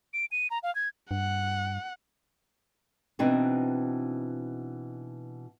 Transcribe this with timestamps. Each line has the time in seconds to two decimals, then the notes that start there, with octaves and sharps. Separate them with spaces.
0.13 D7
0.32 D#7
0.50 A#5
0.63 F5
0.75 G#6
1.11 G2 F#5
3.19 B2 E3 C4 D4 D#4